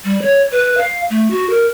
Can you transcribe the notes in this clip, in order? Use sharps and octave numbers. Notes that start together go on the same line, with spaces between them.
G3
C#5
B4
F5
A3
F#4
A#4